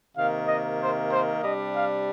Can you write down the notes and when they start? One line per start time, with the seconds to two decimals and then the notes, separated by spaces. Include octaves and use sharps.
0.17 C3 D#3 A#3 F5
0.48 D#5
0.80 C5
1.11 C5
1.42 C3 G3 D4 D#5
1.75 F5